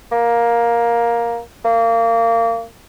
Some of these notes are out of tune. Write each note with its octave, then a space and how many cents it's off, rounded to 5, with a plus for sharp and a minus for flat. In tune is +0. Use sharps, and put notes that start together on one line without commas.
A#3 +10
A#3 -25